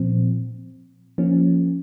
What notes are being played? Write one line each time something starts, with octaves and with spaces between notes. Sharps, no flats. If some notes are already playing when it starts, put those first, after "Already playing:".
Already playing: A#2 F3 C4
F3 A#3 C#4